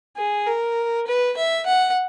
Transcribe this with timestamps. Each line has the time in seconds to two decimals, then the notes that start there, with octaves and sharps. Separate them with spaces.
0.17 G#4
0.46 A#4
1.06 B4
1.36 E5
1.66 F#5